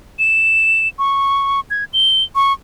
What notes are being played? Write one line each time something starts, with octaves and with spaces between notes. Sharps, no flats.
E7
C#6
G#6
G7
C#6